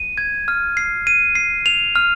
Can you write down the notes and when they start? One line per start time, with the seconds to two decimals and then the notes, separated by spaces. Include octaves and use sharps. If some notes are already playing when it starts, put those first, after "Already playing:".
Already playing: D#7
0.18 G#6
0.48 F6
0.77 C7
1.07 D#7
1.35 C7
1.66 F7
1.96 F6